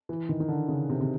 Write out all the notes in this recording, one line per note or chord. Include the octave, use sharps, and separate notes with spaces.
E3
D#3
D#3
D3
C#3
C3
C3